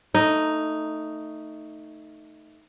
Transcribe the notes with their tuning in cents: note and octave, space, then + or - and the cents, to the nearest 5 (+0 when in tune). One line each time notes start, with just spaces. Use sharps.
A3 +15 D#4 +0